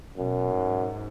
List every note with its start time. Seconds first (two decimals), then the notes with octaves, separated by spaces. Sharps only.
0.17 F#2 B2
0.51 G#2